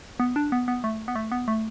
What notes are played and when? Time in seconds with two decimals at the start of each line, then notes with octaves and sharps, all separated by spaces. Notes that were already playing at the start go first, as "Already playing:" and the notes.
0.20 B3
0.36 D4
0.52 B3
0.68 B3
0.84 A3
1.08 B3
1.15 A3
1.32 B3
1.48 A3